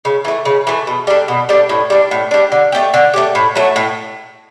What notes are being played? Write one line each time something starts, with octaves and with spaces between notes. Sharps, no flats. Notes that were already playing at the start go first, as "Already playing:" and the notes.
C#3
E3 A3
C#3
E3 A3
B2
G3 D4 A4
B2
G3 D4 A4
A2
G3 D4
A2
G3 D4
D3
A3 C#4 G4
D3
A3 C#4 G4
A2
F#3 A3
A2